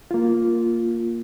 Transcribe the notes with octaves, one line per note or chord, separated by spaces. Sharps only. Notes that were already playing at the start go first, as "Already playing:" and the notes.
A#3 F4